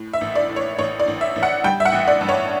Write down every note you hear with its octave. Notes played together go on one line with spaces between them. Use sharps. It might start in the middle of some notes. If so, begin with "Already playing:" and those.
Already playing: A2
E5
A1
D5
A2
C#5
A1 C#5
D5
A1
E5
A1
F#5
G3 G5
E5
F#5
A1
D5
G2
C#5